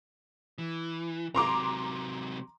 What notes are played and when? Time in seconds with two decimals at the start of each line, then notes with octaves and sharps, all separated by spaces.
0.58 E3
1.35 C3 F#3 A#5 C6 D6